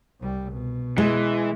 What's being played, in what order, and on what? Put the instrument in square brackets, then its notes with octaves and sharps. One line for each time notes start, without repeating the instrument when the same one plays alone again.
[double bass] C2 G3
B2
[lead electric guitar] E3 [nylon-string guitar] G#3